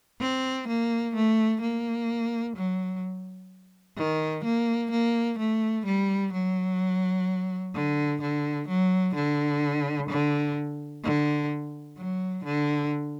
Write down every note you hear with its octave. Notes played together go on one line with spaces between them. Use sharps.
C4
A#3
A3
A#3
F#3
D#3
A#3
A#3
A3
G3
F#3
D3
D3
F#3
D3
D3
D3
F#3
D3